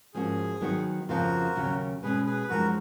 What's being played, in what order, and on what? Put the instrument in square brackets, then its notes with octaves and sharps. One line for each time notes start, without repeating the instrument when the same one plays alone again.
[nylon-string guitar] G#2 F3 A#3 C#4 F#4 [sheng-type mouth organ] G#4
[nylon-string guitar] D#3 F#3 B3 D#4 F#4
[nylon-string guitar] F2 C#3 F3 B3 F4 [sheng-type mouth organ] F#4 A#4
[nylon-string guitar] D#2 C#3 F#3 C#4
[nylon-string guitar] B2 G#3 C#4 [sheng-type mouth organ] G#4 B4
[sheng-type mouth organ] G#4 B4
B4
[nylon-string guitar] F#2 F3 G#3 D#4 [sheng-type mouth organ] F#4 A#4